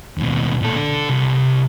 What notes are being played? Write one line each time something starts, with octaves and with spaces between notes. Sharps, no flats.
D#2 B2
A#2 A4
D4 A4
C2